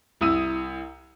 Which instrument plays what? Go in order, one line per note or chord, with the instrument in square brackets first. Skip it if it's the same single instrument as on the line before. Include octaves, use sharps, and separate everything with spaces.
[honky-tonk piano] C2 E4 D#6 E6 D#7